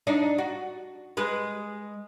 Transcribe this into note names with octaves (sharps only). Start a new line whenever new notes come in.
D4 D#4 D5
F#4
G#3 B4